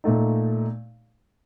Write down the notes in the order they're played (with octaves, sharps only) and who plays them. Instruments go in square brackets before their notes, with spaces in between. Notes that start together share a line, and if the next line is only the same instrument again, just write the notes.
[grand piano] A#2 A3 D#4